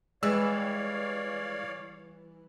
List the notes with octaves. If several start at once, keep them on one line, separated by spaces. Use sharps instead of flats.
E3 G3 G#3 C#5 D5 F5 E6